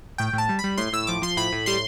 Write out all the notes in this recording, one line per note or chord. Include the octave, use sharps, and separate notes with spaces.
A2 G5
A2
A5
G3
B5
G3
A2 C6
A2 E6
F3 D6
F3 C6
A2 B5
A2
G3 C6